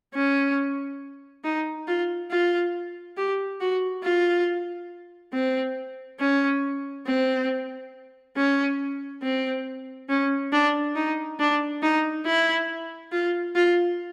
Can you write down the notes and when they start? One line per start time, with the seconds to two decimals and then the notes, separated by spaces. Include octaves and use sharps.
0.14 C#4
1.44 D#4
1.87 F4
2.31 F4
3.17 G4
3.60 F#4
4.04 F4
5.33 C4
6.20 C#4
7.07 C4
8.36 C#4
9.23 C4
10.09 C#4
10.53 D4
10.96 D#4
11.39 D4
11.83 D#4
12.26 E4
13.12 F4
13.56 F4